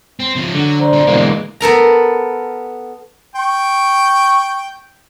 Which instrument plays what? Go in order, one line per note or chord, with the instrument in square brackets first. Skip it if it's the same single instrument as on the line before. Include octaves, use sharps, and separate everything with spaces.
[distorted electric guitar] C4
C#3 F3
[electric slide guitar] D3 [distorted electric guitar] F#3
[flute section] C5 D5 A#5
[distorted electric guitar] A#2 F#3
[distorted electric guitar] B2 D3 [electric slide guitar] E3 G#3 A#3
[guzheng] B3 A4 A#4 A#5
[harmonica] G5 C#6